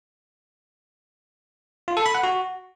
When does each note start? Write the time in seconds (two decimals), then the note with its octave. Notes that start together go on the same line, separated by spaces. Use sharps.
1.88 F4
1.97 A4
2.06 B5
2.15 F#5
2.23 F#4